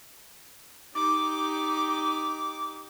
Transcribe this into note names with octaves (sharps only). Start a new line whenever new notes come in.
D#4 G4 D6